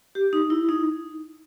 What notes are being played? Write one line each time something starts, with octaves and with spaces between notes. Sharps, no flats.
G4
D#4
E4
D#4